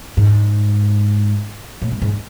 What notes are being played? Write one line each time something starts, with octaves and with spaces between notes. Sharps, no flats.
G#2
A2
G#2
G#2